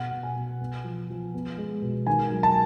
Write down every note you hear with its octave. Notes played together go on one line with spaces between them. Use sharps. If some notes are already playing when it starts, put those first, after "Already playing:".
Already playing: B2 F#5
B2
G#5
B2
B3
F3
F3
B3
G#3
B2
D#3 G#5
F#3
A5